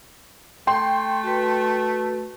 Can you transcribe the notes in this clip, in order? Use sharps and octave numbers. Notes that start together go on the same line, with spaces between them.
A3 G5 C6
F#4 B4